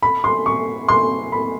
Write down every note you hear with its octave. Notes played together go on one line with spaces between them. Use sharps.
B5
C6
C#6
C6
B5